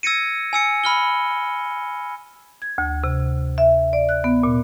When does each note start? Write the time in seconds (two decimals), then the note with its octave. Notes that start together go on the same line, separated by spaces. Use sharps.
0.03 E6 G#6 A#6 C#7 D#7
0.53 G#5 E6 C#7
0.84 B5 F6 G7
2.62 G#6
2.78 D2
3.04 C3
3.58 E5
3.93 D5
4.09 F#6
4.24 B3
4.43 A#2